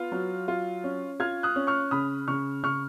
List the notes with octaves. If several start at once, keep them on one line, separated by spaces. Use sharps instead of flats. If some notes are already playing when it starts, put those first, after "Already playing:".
Already playing: B3 F4 F6
F#3
F4
C#4
F4 F6 G#6
D#6 F#6
C#4
C#6 F6
C#3 B5 D#6
C#3 C#6 F6
C#3 C#6 F6